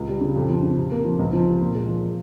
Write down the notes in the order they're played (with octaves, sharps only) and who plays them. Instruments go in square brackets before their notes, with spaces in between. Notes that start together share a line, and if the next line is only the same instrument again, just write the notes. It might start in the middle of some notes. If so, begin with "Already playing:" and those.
Already playing: [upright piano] C#2
G3
C#3
F2
F3
C#3
C3
A#3
F3
C#2
F3
C3
A#2
G#3
F3